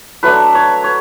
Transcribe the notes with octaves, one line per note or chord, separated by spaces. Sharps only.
F#3 A3 D4 B4
C#5
C#5